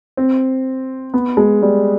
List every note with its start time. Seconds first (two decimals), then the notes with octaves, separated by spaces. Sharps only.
0.17 C4
1.14 B3
1.37 G#3
1.62 G3